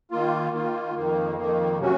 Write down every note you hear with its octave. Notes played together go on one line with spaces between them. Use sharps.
D#3 A#3 F4
D#3 A#3 F4
F2 D#3 A#3
F2 D#3 A#3
C3 F#3 C#4 F#4